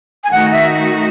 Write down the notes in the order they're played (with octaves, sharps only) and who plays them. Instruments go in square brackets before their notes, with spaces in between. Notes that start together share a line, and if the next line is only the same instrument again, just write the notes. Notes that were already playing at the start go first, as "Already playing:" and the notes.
[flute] G#5
[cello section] D#3 A3 D#4 F#4 [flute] F#5
[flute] E5